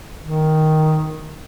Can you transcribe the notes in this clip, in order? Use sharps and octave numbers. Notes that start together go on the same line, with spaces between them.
D#3